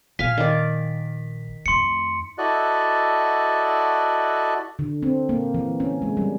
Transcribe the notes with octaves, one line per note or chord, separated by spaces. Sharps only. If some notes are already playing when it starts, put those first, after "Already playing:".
A#1 F5 G#5 B6
D#3 D5
F2 A3 C6 C#7
E4 F#4 A4 D5 D#5 F#6
D3
C4
A#3
E3
C#4
G#3
G3